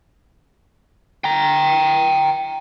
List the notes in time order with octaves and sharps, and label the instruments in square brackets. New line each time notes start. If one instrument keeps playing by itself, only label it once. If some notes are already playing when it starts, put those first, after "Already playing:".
[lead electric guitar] G5 A#5